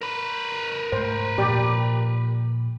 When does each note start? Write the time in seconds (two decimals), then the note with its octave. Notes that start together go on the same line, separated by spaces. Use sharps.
0.01 A#4 B4
0.92 G#2 A3 C5
1.38 A#2 F3 G4 D5